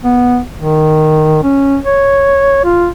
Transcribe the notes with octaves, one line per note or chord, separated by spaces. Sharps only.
B3
D#3
C#4
C#5
F4